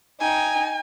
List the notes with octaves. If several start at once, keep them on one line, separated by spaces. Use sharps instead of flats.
D#4 G5 G#5